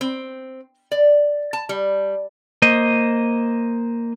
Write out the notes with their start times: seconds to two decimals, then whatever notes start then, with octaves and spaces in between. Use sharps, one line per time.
0.01 C4
0.92 D5
1.53 A5
1.69 G3
2.62 A#3 C5 D#5